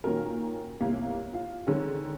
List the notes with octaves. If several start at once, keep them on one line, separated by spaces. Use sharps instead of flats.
A#2 D#3 C#4 F#4 A#4
G1 C2 A#3
F4 F5
D3 D#3 G#3 C4 C#4